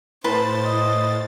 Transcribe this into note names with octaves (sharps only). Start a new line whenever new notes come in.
A2 B4 C5 A5 C6 A6
D#5